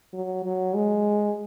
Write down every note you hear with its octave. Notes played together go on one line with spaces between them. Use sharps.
F#3
F#3
G#3